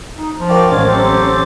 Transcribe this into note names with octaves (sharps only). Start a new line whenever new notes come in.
D#4
F3
F#4 A#4 D5 F5 G5 D6
A1 G#3 C#4 C5 F5 G#5 A6
F#3 C4 G4 A4